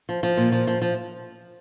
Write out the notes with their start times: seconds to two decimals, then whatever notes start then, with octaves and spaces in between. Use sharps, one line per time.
0.09 F3
0.23 F3
0.37 A#2
0.52 F3
0.67 F3
0.82 F3